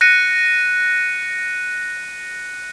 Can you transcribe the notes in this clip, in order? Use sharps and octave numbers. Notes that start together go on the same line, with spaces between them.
F#6 A#6 C#7 D#7